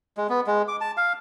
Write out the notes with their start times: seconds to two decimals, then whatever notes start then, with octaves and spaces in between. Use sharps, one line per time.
0.17 G#3
0.29 B3
0.47 G#3
0.68 D6
0.81 A5
0.97 F5